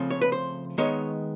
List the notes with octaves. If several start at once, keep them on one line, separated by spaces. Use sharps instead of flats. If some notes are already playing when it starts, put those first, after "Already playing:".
Already playing: C#3 F3 A3 C4
C#5
B4
C5
D#3 G#3 B3 C#5